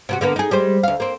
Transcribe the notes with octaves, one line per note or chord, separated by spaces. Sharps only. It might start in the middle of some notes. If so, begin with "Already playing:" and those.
C3 C4 F#4
D3 A#3 B3
D#4 G#4
G3 G#3 C5
D2 F5
A#3 C4